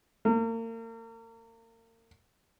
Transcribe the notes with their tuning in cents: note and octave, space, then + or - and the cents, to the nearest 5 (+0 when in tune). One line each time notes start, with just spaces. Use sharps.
A#3 -40